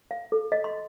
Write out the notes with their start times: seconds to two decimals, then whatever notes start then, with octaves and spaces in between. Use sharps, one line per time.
0.11 F5
0.32 A4
0.52 D#5
0.64 C6